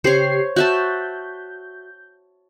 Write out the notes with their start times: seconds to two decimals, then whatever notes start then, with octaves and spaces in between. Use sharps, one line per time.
0.04 C#3 G4 C5 C#5 C7
0.56 F#4 E5 A5 G6